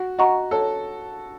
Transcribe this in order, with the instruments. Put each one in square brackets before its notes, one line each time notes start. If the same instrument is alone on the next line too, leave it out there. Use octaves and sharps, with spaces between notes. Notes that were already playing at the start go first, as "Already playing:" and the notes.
Already playing: [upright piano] F#4
[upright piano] F#4 [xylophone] D#5 F#5 A#5 C#6
[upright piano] A4 [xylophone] C#5